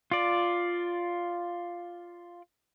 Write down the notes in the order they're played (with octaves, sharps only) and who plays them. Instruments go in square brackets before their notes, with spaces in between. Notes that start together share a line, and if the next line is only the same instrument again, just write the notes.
[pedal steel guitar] F4 D5